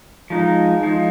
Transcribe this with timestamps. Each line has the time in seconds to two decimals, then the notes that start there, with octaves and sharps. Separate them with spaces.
0.30 F3 G#3 D#4
0.83 F3 G#3 D#4